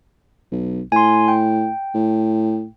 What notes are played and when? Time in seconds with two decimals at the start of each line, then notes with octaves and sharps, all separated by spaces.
0.51 B1
0.92 A2 G#5 C6
1.28 G5
1.95 A2